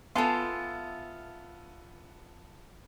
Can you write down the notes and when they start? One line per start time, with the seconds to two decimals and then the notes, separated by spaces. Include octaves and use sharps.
0.16 B3 F4 A4 E5 F5 G#5 A5 C6